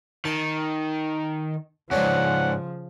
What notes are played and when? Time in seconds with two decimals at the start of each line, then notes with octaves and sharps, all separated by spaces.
0.25 D#3 A5 C6
1.91 E2 G#2 C#3 F3 C#4 D4 B4 F#5